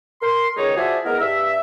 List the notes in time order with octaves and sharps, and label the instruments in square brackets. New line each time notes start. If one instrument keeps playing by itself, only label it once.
[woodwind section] A#4 C6
C#2 D#3 G#3 D#4 C#5
F3 E4 F#4 G#4 D5 E5
G#3 B3 E4 A#4
G2 E5